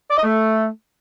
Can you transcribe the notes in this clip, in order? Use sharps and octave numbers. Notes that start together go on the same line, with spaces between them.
D5
D#5
A3